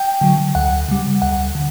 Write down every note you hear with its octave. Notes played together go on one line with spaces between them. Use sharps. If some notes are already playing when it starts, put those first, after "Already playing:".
Already playing: G5
D3 F#3
D2 F#5
C#3 G3
D2 F#5
D3